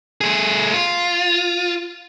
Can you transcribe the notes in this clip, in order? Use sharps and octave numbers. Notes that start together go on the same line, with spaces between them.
A3 G#4
F4